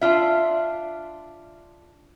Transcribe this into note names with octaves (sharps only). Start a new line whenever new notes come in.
D4 F4 E5